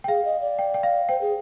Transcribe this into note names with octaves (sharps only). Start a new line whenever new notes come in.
G5
G#4 F5
D#5
D5
G5
G5
F5
C5 G5
G#4